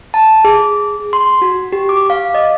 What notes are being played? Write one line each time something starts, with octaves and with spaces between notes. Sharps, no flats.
A5
G#4
C6
F#4
G4
D6
F5
D#5